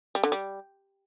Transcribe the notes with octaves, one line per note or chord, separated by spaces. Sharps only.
G3
D3
G3